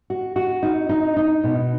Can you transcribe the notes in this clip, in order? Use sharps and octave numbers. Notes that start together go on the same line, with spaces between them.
F#4
F#4
D#4
D#4
D#4
B2